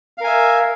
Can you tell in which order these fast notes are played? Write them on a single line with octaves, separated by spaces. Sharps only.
F5 A#4 G#5 E5